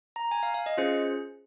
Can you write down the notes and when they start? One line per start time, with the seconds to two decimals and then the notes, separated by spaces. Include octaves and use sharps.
0.16 A#5
0.31 G#5
0.43 F5
0.54 F5
0.66 D#5
0.77 C#4 F4 G#4 C5